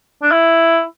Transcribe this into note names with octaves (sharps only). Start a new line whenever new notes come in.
D4
E4